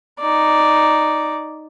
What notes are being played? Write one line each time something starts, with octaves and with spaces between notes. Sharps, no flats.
D#4 D5